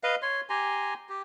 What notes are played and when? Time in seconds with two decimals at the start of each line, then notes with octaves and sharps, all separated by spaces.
0.03 B4 D#5 F5
0.22 C#5 C6
0.49 G4 G#5 A#5 C6
1.09 G4